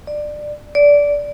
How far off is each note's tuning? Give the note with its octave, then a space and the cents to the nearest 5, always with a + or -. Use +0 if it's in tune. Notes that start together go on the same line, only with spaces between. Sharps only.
D5 +20
D5 -15